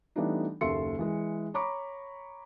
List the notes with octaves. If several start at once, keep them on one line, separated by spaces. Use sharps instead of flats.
E3 G3 A3 B3 D4 D#4
F#1 D#2 A4 E5 C6 C#7
E3 G#3
C#5 A#5 B5 C#6 D6